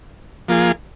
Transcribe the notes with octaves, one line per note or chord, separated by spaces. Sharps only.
F3 A#3 F4 G#4